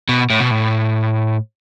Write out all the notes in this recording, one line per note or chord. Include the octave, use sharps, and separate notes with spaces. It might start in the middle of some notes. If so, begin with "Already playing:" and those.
B2
A2
B2
A2